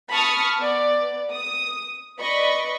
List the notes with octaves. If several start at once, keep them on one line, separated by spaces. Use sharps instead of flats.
A5 B5 C#6 D#6 F6
B3 D5
D#6
B4 D5 D#5 B5 C#6